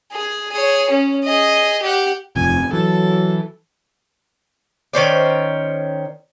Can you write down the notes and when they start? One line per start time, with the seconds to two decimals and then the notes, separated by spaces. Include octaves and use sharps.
0.12 G#4
0.52 G#4 C#5
0.90 C#4
1.24 G#4 D#5
1.82 G4 F#5
2.36 D#1 F2 C3 F3 G#5
2.73 E3 F#3 A4
4.93 D#3 C#4 C5 D5